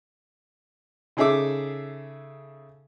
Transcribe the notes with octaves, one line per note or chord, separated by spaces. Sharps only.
C#3 D#4 G#4 A4 E5 D6